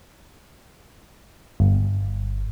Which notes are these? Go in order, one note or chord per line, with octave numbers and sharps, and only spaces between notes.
G1